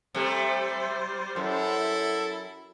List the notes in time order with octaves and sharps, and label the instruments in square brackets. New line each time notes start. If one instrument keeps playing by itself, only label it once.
[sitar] C3 A3 [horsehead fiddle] G3 C5
[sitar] F#2 [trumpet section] E4 A4